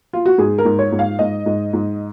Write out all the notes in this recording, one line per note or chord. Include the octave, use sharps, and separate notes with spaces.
F4
F#4
G#2 G#4
A#4
G#2
C#5
G#2
F5
G#2 D#5
G#2
G#2